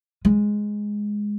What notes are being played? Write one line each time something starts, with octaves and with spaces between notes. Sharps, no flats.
G#3